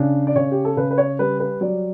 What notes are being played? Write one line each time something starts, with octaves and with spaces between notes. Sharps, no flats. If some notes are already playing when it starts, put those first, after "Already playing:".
Already playing: C#3 D4
D5
C#3 C#5
G4
A4
C#3 B4
B4
C#5
G3 B4
B4
F#3 D5